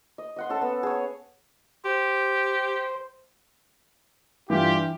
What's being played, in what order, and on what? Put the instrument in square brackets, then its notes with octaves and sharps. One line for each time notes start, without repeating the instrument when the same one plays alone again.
[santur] D#5
D#5 F#5 C6
C#4 A4 A5 E6
B3
G#4 C#5
[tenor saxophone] G4 [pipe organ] C5
[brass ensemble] G2 F4 G4 [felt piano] E3